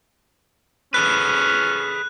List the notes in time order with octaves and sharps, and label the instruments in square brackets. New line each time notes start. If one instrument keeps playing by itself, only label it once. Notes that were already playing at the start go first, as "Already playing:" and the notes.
[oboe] C#4 [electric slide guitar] G#4 A4 B4 [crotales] F#6